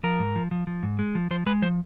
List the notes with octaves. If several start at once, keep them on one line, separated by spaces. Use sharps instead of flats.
F3 A#4
G#2
F3
F3
F3
G#2
G#3
F3
F3 C5
G#3 B4
F3 C5